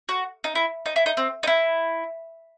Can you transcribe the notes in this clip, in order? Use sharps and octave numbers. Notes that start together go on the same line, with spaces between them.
F#4
D#4
E4
D#4
E4
D#4
C4
D#4
E4